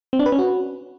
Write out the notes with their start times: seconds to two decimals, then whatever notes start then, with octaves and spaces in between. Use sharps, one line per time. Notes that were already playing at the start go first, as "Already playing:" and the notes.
0.13 C4
0.19 D4
0.26 B4
0.32 C#4
0.39 F#4